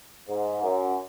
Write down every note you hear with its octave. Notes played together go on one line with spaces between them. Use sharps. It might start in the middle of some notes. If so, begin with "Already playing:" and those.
G#2
F#2